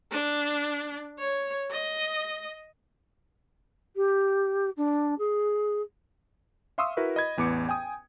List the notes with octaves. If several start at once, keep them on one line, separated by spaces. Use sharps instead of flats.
D4
C#5
D#5
G4
D4
G#4
E5 F5 C6 C#6 D#6 E6
E4 F#4 A#4 B4 E5
D#5 B5 G#6
A1 E2 B3 D6 C#7
G5 G#5 D#6